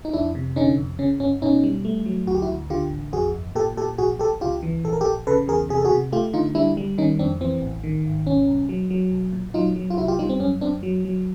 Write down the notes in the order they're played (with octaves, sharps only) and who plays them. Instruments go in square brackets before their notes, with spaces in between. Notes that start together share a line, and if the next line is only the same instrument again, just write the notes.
[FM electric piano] D#4
F2 D4 E4
C3
D3 C#4 D#4
F2
C#3 C#4
G1 C#4
B2 C#4 D#4
G3
A3
F#3
D2 F#4
G4
E4 F#4
D2
D3 F4 G4
A1
F2 F#4 G#4
G1
A#2 G4 A4
A#2 G4 A4
A#1 F#4 G#4
A#1 G4 A4
C#2 F4 G4
E3
A#1 A4
A#4
G4 A4
A#1
C#3 A4 B4
E2 G#4 A#4
C3 G#4
A4
F#4 G#4
C3
A3 F4 G4
D3 D#4 F4
G3 D4 E4
G3
D#3 C#4 D#4
F2 C4 D4
E3 C4
A1
D#3
G#1
B1 C#4
B1
F#3
F#3
B1
A#2
F#3 D#4 F4
F#3
F4
C2 E4 F#4
F4 G4
G3 D#4 F4
C4
F#2 C#4
F#2 C4 D4
F#3
F#3